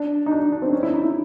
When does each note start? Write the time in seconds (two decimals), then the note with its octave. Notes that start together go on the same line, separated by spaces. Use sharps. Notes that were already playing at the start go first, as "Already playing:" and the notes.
Already playing: D4
0.26 D#4
0.31 D4
0.42 D4
0.52 D4
0.62 C4
0.73 C#4
0.83 E4
0.93 D#4
1.04 E4